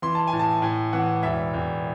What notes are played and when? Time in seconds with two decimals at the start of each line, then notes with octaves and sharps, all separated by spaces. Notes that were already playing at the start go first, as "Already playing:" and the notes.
0.02 E3 C6
0.15 A5
0.27 G#5
0.33 A2
0.39 A5
0.62 A2 G#5
0.93 E3 F#5
1.23 E1 E5
1.54 E1